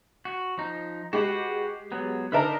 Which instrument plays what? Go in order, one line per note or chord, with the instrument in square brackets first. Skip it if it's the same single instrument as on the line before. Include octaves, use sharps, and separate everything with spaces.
[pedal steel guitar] F#4
F3 D#4
[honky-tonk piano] G#3 G4 [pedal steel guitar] F#4 B4 F#5
[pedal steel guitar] F#3 B3
[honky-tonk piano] D3 D#4 A#4 [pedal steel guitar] B4 A5 A#5